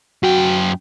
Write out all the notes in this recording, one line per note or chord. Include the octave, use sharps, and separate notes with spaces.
F#2 F#4 G5